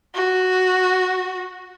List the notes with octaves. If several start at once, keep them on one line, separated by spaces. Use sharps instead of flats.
F#4